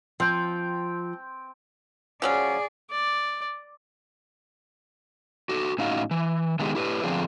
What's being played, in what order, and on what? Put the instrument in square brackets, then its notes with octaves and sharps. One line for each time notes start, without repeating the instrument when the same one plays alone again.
[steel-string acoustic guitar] F3 [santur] C4 G5
[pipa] F3 F#3 C#4 [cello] G#4 D5
[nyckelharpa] D5
[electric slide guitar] F#4 A4
A2 C#4 D#4 F#4 F5
E3
D#3 G#3 B3 D#4 G4 G#4
E4 G4 B4
D3 F3 C4 D4 F4 G#4